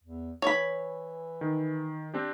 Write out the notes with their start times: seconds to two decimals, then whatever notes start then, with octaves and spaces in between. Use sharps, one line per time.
0.04 E2
0.42 E3 C#5 B5
1.41 D#3
2.14 C4 D4 G4